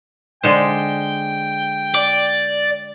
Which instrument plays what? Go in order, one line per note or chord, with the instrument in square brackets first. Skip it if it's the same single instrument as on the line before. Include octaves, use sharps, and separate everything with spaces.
[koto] D3 G#3 C5 [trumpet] G5
[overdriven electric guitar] D5